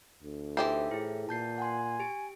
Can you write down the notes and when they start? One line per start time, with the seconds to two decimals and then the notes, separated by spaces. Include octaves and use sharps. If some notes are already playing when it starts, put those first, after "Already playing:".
0.23 D2
0.57 E3 D#4 G4 A4 C5 E5
0.91 A2 E4 G#4
1.29 A#2 A5 G6 C7
1.58 F#5 G#5 C6
2.00 G4 D7